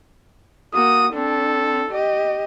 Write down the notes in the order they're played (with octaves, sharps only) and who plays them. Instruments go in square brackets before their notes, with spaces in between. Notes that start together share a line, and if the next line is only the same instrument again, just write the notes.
[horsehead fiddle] A#3 F#4 [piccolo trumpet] D#6
[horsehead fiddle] C4 D4 [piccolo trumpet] A4
[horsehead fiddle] G4 D#5